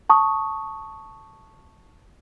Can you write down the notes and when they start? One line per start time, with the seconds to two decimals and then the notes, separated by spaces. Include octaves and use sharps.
0.10 A5 C#6 D#6